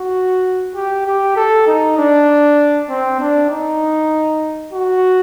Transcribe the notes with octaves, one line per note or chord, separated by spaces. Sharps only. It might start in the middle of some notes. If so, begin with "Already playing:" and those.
Already playing: F#4
G4
G4
A4
D#4
D4
C4
D4
D#4
F#4